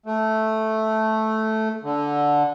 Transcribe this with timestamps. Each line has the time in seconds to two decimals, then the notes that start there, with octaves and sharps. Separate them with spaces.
0.06 A3
1.83 D3